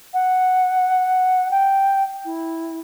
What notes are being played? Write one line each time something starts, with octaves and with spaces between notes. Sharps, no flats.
F#5
G5
E4